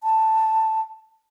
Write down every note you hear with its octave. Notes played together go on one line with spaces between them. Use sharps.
A5